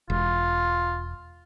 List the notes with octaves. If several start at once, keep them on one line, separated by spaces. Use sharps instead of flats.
E1 F4